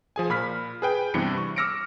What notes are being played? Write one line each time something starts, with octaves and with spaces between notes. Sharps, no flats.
F3 G#4 G#5
A#2 B5 F6 B6
G#4 B4 G5
G2 C3 E3 B3 C#7
C#6
D6 E6 F6 A#6 C#7 D7